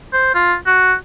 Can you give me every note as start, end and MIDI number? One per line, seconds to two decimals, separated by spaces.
0.13 0.30 72
0.35 0.55 65
0.67 0.94 66